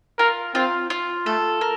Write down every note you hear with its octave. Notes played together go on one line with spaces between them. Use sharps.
F4 A#4
C4 F4
F4
A3 A4
A#4